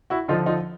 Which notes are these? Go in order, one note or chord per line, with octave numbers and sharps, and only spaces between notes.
E4 F#4
D3 F3 D#4 F4
D#4 F4